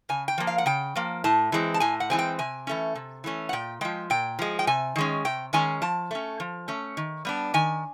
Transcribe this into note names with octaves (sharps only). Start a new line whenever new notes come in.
C#3 G#5
G5
F3 A#3
F5
F#5
C#3 G5
F3 A#3
A2 A5
E3 G#3 C4
A5
A2 G#5
F#5
E3 G#3 C4 G#5
G5
C3 G#5
E3 A3 C#4
C3
E3 A3 C#4
F#5
A#2 G5
F3 G#3 G5
A#2 G5
F3 G#3
G5
C3 G#5
D#3 G#3 C#4
C3 G5
D#3 G#3 C#4 G#5
F3 A5
A3 C#4
F3
A3 C#4
D#3
G3 B3 D4
D#3 G#5